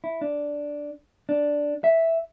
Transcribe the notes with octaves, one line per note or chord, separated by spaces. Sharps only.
E4
D4
D4
E5